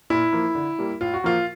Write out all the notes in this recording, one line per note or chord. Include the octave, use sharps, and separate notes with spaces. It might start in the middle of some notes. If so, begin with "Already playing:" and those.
A#2 E4
F3 A#3
D3
G3 A#3
A2 F4
F#4
F3 A#3 F4